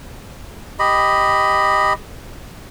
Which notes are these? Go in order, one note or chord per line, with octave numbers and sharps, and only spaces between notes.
G4 D#5 B5